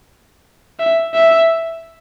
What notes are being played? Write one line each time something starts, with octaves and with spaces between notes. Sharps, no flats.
E5
E5